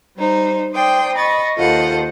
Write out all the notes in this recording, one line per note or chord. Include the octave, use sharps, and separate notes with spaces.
G3 D#4 C5
C5 D5 G5 C6 D#6
D#5 B5 C#6 A6
D#2 F4 A4 C5 D#5 F#5